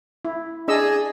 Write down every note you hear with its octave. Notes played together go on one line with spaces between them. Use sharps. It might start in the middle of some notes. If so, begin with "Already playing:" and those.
E4
D4 G#4 D#5 E6